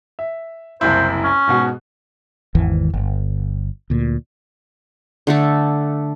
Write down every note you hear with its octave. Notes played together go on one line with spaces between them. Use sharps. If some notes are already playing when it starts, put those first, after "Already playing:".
E5
F#1 C2 E4 C5
C#4
G#2 B2 F#4
G#1 E2 D#3 E3
G1
D2 A#2
D3 A3 A4